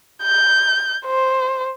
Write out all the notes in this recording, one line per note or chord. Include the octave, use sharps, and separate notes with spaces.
G6
C5